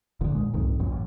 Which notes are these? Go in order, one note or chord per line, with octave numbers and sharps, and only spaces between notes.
F1 A#1 A#2 D3
A#2 G#3
C2 F2 G#2 D#3
F#1 B1 F#2 A#2
A1